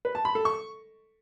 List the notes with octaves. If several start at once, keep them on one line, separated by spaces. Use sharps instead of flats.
B4
A5
B5
A4
C#6